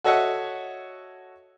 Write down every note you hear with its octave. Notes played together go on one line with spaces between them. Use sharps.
F#4 A4 C#5 D#5 E5 F#5